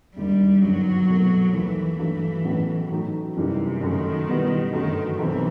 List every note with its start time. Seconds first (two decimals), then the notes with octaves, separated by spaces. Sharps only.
0.16 E1 D#2 D#3 G3
0.62 G1 F#2 D#3 F#3
1.08 C2 B2 A3
1.53 D#2 D#3 E3 A3
1.99 G2 F#3 A3
2.44 A1 A2 F#3 B3
2.91 A2 F#3 A3 D#4
3.36 F#1 F#2 C3 E3 G3 D#4
3.81 F#1 F#2 D#3 F#3 A3
4.27 B2 G3 B3 E4
4.72 G1 F#2 D#3 F#3 A3
5.18 B1 B2 E3 F#3 C4